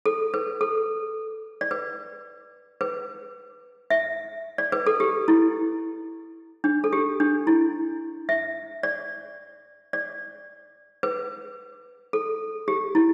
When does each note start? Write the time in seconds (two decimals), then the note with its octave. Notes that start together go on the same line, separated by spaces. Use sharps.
0.06 A4
0.34 B4
0.61 A4
1.61 D5
1.71 B4
2.81 B4
3.90 E5
4.58 D5
4.72 B4
4.86 A4
5.00 G4
5.28 E4
6.64 D4
6.84 A4
6.93 G4
7.20 D4
7.47 E4
8.29 E5
8.83 D5
9.93 D5
11.03 B4
12.13 A4
12.68 G4
12.95 E4